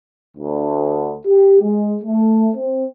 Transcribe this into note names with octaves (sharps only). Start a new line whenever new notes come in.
D2
G4
G#3
A3
C4